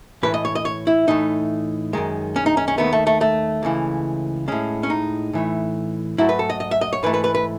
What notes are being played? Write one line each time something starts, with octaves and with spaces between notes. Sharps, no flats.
A2 E3 A3 B4
D#5
C#5
D#5
C#5
E4
A2 E3 A3 D#4
F#2 D#3 G#3
C#4
D#4
C#4
C#4
D#2 D#3 A3 B3
A3
A3
A3
C#2 C#3 E3
A2 G#3 C#4
C#4
D#4
A2 E3 A3
G#2 F#3 A3 E4
B4
A4
D#5
D#5
E5
D#5
C#5
G#2 E3 A3 B4
B4
B4
B4